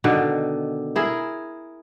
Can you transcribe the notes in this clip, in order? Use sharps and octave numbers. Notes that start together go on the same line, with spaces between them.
B2 D3 D#3
E4 G#4 A#4